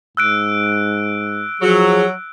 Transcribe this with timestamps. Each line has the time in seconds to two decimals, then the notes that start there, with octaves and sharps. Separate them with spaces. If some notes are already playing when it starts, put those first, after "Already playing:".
0.17 G#2 E6 F#6 D7
1.61 F3 F#3 G#4